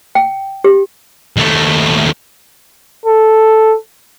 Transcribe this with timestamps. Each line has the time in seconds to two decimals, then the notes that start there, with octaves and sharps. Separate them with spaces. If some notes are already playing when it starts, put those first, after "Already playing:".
0.15 G5
0.64 G4
1.37 D#2 A3
3.06 A4